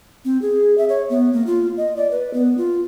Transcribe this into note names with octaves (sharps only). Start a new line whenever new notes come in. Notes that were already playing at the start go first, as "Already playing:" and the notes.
C4
G#4
E5
C#5
B3
A#3
F4
D#5
D5
B4
B3
F4